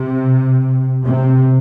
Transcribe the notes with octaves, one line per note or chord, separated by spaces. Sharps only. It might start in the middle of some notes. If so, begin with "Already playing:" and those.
Already playing: C3
C3